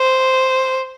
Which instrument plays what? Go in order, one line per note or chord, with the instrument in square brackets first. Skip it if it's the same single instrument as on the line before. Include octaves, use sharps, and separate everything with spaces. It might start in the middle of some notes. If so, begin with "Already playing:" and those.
Already playing: [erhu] C5